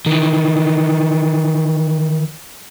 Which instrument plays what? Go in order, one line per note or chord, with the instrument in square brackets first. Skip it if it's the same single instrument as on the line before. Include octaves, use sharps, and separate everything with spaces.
[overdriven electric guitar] D#3 E3